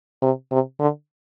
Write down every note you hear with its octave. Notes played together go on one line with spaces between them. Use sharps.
C3
C3
D3